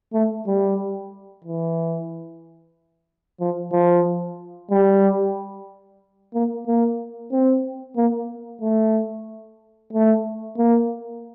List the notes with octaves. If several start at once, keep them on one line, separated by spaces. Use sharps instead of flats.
A3
G3
E3
F3
F3
G3
A#3
A#3
C4
A#3
A3
A3
A#3